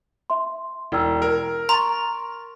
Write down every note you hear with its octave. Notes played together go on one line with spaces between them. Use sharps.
E5 C6
E1 E4 G5 E6
A#4
A#5 C6 C#6 A6